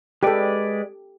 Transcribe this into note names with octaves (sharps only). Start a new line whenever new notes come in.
G#3 G4 A4 B4 D5